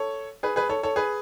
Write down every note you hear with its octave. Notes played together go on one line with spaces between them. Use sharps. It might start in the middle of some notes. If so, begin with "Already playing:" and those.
Already playing: A4 C#5
G#4 B4
G#4 B4
A4 C#5
A4 C#5
G#4 B4